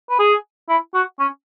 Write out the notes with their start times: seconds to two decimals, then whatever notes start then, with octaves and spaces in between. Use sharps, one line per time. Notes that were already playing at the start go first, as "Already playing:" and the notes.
0.10 B4
0.19 G#4
0.69 E4
0.94 F#4
1.19 C#4